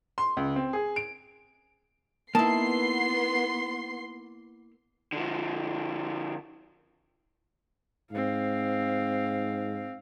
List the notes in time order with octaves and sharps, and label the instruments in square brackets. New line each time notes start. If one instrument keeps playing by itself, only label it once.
[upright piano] C6
C#2
C4
G#4
D7
[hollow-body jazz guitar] A#3 E4 [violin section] B3 C6 C7 [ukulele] D#4 A5
[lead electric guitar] D3 F3
[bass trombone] G#2 [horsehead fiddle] C4 F5